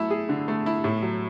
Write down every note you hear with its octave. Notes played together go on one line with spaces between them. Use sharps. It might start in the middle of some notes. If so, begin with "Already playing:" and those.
Already playing: F#3 A3 E4
G#4
D3
A3
E4
A2
F#3